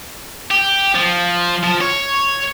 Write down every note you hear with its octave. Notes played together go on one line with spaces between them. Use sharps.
G4
F3
F3
C#5